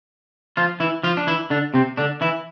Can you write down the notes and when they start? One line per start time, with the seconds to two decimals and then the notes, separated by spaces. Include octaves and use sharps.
0.57 F3 F4
0.80 E3 E4
1.03 F3 F4
1.17 D4
1.27 E3 E4
1.50 D3 D4
1.74 C3 C4
1.97 D3 D4
2.21 E3 E4